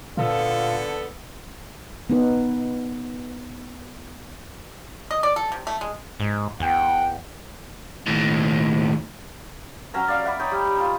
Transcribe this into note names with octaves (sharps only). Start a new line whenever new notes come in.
A#2 D3 B3 F4 A4
B3 D#4 B4
D#5
D5
A4
C3
A3
G#3
G#2
E2 F#5 G5
D#2 A2
F#3 C#4 A#5 E6
D5 F5 D6
E5 F#5 B5 D6
D#4 C#5 G5
G3
D#4 F4